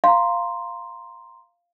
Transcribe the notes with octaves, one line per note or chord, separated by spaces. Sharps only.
F5 A#5 C6